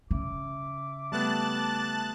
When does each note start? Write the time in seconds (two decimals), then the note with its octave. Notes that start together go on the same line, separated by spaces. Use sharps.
0.11 C#3 E5 D6
1.12 G3 A3 B3 A5 F#6 A6